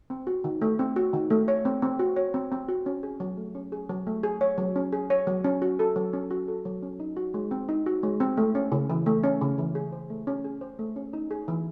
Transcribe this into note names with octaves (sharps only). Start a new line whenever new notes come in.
C4
F#4
D#3
A3
C4
F#4
D#3
A3
C#5
C4
C4
F#4
C#5
C4
C4
F#4
C#4
G#4
F#3
A3
C#4
G#4
F#3
A3
G#4
C#5
F#3
C#4
G#4
C#5
F#3
C#4
F#4
A4
F#3
C#4
F#4
A4
F#3
C#4
D#4
F#4
G#3
C4
D#4
F#4
G#3
C4
A3
C#4
C#3
E3
A3
C#4
C#3
E3
G#4
C5
A3
C#4
G#4
C5
A3
C#4
D#4
G#4
E3